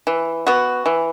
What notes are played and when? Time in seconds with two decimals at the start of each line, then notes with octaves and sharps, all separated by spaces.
0.07 E3
0.47 B3 F#4
0.86 E3